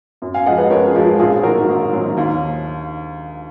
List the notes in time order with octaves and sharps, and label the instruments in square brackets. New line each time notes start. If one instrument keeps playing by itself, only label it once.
[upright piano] F#2
F5 G#5
F3 G#3 D#5 F#5
B4 D#5
F#2 A#4 C#5
G#4 B4
F3 G#3
F4 G#4
A#1 F4 G#4
G#2 D#3 F#3 F#4 A#4
A#1
G#2 D#3 F#3
D#2